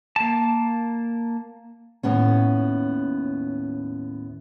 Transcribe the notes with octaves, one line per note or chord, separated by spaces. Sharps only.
A#3 A5
D#2 A2 B3 C#4